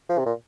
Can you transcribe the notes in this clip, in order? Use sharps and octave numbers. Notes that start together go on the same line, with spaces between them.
F3
C3
A#2